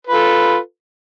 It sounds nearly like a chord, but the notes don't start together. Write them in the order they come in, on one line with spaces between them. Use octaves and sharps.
B4 F4 A4